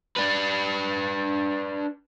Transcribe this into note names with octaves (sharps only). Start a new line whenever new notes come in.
D4 B4